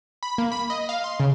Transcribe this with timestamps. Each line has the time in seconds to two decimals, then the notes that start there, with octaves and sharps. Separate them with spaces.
0.23 B5
0.38 A#3
0.52 B5
0.70 D#5
0.89 F5
1.04 C6
1.20 C#3